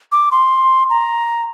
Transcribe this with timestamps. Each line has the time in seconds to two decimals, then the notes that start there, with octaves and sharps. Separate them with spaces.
0.12 D6
0.31 C6
0.90 A#5